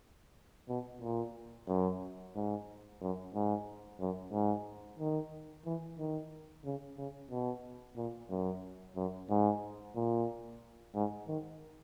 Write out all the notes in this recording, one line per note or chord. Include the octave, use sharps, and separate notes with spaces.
B2
A#2
F#2
G#2
F#2
G#2
F#2
G#2
D#3
E3
D#3
C#3
C#3
B2
A#2
F#2
F#2
G#2
A#2
G#2
D#3